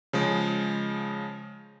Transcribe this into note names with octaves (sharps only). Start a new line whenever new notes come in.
C#3 F3 G#3